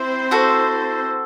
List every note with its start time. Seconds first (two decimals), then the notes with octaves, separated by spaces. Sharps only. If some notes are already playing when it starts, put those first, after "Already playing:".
Already playing: C4 E4 C5
0.31 F#4 A4